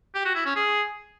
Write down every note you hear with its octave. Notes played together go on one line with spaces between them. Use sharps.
G4
F#4
E4
C#4
G#4